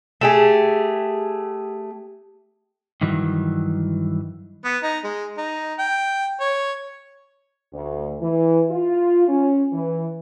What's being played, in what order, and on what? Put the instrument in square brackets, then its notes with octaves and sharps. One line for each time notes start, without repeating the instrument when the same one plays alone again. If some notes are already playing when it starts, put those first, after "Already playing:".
[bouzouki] A3 G4 G#4
[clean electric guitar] G2 D#3 E3 F#3
[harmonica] B3
D#4
G#3
D#4
G5
C#5
[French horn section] D2
E3
F4
C#4
E3